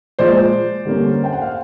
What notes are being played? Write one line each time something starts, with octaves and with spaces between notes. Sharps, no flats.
A#2 F3 G#3 C5 D5
D3 G3 A#3 C#4
G5
F#5
F5